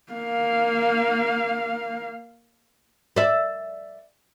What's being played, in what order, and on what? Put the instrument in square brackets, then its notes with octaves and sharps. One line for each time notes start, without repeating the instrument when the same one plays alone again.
[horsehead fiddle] A#3 F5
[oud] D5 E5